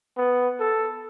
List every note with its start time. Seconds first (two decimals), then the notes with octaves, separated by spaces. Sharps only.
0.17 B3
0.60 A4